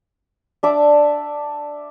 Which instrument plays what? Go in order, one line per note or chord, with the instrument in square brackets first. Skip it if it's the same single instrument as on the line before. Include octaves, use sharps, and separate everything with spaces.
[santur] D4 E5 D6